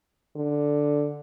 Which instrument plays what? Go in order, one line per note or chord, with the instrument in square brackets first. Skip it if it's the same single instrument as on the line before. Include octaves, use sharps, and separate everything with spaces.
[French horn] D3